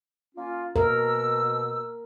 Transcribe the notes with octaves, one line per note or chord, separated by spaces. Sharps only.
A#3 C#4 F4
B2 A#4 E6